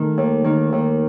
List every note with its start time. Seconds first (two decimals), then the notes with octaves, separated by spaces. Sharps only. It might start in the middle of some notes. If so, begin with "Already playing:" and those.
Already playing: D#3 A3
0.18 D#2
0.44 D#3
0.72 D#2